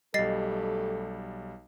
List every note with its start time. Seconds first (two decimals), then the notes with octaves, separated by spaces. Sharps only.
0.14 B1 G3 A3 G4 A4 D#5 A6 C7